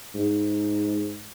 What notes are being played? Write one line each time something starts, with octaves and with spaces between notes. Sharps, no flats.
G#2